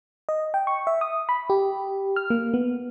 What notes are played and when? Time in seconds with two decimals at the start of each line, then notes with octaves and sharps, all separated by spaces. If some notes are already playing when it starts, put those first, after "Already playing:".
0.29 D#5
0.54 G5
0.67 C#6
0.87 E5
1.01 D#6
1.29 B5
1.50 G4
2.16 F6
2.30 A#3
2.54 B3